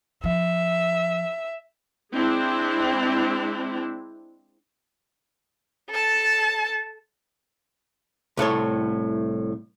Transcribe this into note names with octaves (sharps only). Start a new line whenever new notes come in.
F3 E5
G#3 C4 D4 E4
A4 A5
C2 A2 A4 C#5